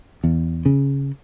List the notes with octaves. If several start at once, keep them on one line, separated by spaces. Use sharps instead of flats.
E2
C#3